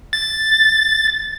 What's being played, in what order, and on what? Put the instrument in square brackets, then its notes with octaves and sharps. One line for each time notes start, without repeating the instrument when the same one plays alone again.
[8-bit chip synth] A6